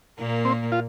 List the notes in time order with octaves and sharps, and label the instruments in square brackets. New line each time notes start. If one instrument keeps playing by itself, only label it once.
[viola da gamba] A#2 A#3
[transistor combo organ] C4
F4